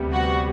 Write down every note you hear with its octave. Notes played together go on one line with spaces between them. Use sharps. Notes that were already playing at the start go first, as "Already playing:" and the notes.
Already playing: D2 C3 G3 B3
F#4 F#5